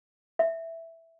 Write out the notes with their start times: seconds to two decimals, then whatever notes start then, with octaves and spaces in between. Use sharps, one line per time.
0.39 E5